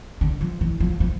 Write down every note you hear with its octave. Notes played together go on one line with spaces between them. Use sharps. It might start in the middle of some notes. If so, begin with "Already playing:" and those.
D3
F3
E3
F3
F3